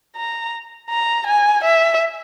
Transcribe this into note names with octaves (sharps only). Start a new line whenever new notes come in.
A#5
A#5
G#5
E5